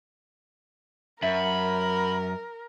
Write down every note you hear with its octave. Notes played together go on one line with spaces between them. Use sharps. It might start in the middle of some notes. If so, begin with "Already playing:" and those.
F#2 A#4 E5 B5